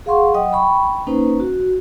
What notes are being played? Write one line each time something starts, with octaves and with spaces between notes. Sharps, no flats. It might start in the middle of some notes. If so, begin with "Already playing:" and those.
G#4 F5 F#5 C6 C#6
F#3 D#5 F#5 G5 D#6
G5 B5 C#6
A#3 C#4 D#4 B4 C5
F#4